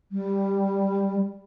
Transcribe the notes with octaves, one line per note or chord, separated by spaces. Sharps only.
G3